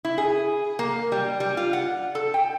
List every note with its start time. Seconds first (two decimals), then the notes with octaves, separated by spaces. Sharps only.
0.05 E4
0.18 G#4
0.79 A#3
1.12 G3
1.40 G3
1.57 F4
1.73 F#5
2.15 A4
2.34 G5